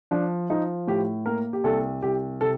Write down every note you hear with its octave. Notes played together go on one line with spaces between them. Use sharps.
F3 D4
F3 D#4
A2 G4
A#3 A#4
G4
C2 A4
C2 G4
C3 A4